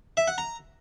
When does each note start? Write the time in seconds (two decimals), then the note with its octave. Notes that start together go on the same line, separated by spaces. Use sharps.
0.17 E5
0.28 F#5
0.38 A#5